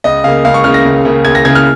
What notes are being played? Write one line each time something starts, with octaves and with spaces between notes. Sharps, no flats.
C#2 D#5
C#3 A#3 F5
C#2 F5
C#6
C#3 A#3 F6
A#6
C#2
C#3 A#3
C#2 G#6
A#6
C#3 A#3 G#6
F6